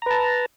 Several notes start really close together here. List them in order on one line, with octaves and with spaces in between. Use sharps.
A#5 B4 A5